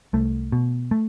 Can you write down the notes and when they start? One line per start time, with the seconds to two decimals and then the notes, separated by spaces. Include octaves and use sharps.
0.13 C2 A3
0.52 B2
0.91 A3